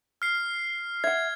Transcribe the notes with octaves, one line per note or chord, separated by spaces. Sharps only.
F6 C7
E5 F#5 G#6